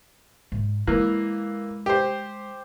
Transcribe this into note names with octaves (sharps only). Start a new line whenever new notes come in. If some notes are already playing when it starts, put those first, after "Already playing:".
G#2
E3 G#3 A#3
G4 C5